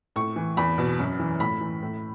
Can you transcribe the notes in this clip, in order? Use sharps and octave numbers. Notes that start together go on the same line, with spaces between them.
A2 C#6
E3
E2 B5
B2
F#2
E3
A2 B5
E3
A2